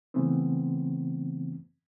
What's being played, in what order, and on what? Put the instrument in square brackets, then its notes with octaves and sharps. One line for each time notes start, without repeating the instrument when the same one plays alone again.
[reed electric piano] C#3 E3 A3 B3 C4